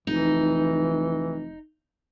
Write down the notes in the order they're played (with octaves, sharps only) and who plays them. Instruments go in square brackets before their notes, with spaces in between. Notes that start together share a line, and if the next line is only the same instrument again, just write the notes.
[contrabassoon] F1 [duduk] E3 [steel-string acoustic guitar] D#4